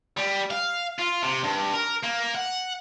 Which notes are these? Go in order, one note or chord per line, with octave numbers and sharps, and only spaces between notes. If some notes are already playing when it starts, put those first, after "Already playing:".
G3
F5
F4
C3
G2
A#4
A#3
F#5